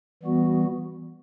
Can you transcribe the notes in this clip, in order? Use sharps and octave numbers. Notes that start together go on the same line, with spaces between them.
E3 G3 B3 F#4